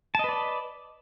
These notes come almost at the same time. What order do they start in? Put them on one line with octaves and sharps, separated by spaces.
A5 D#5 B4 D5